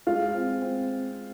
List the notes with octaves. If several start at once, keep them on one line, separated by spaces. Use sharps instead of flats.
G#3 F4 F5
C4
C4